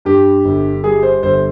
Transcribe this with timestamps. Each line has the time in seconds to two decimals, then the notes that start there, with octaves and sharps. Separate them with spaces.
0.05 G2 G4
0.45 G1
0.84 G3 G#4
1.03 C5
1.23 G1 C5